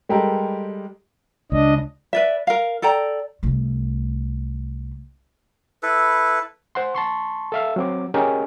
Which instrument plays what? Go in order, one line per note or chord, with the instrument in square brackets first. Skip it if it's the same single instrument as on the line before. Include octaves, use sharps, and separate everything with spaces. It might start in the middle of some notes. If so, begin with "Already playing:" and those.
[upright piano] G3 G#3 G4 A4 A#4
[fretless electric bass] C#2 [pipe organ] D4 D#5
[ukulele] B4 D5 E5
A#4 F5
A4 D5 G5 A#5
[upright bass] C2 A3
[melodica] E4 A4 B4
[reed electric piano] C5 F#5 C6
A5 C6 C#6
A4 E5 F5
F#3 C4 D6
C#4 G4 G#4 A#4 D#5